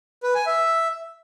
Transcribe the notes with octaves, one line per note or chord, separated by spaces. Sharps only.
B4
G#5
E5